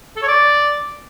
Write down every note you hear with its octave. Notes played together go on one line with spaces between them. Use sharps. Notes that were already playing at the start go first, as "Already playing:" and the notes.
A4
C#5
D5